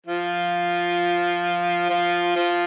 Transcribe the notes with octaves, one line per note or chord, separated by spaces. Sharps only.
F3 F4
F3 F4
F3 F4